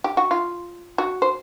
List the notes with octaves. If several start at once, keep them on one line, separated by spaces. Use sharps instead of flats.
G4
F#4
F4
F#4
C5